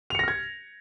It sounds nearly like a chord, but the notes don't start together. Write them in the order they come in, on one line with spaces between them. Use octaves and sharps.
F7 C#7 A#6 F6 G#6